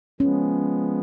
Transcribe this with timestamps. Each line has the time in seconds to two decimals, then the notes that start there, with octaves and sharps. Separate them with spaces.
0.20 F3 G#3 B3 C#4